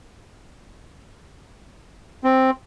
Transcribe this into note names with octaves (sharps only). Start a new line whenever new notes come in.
C4